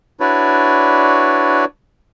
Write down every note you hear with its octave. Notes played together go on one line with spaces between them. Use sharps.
D4 E4 F#4 B4 C#5 D5